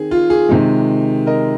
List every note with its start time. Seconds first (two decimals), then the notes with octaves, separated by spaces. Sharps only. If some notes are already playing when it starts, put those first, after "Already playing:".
Already playing: D#3 C4 D#4 G#4
0.11 F4
0.30 G#4
0.49 C3 D#3 G#3
1.26 A#4 D#5